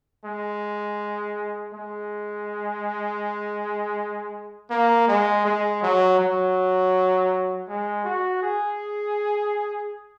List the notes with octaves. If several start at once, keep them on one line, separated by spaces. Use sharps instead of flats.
G#3
G#3
A#3
G#3
G#3
F#3
F#3
G#3
F#4
G#4